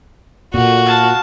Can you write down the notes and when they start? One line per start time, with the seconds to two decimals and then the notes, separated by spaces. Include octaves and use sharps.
0.54 A#2 A3 F#4
0.86 F5 A5